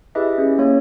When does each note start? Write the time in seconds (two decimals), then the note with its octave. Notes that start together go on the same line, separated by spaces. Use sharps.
0.15 E4 G4 G#4 B4 D#5 E5
0.38 C#4 G#4
0.58 A#3 C#4 C#5